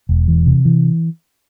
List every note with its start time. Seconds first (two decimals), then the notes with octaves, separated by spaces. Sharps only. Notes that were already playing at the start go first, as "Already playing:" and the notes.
0.09 E1
0.28 E3
0.46 C3
0.65 E3